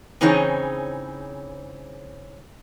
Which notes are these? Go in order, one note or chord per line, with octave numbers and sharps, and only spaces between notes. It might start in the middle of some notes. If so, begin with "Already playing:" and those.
C#3 E3 C4 D#4 G#4 C#5